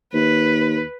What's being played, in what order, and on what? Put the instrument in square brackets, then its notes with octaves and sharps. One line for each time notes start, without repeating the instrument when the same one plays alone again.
[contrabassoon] D#2 [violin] B4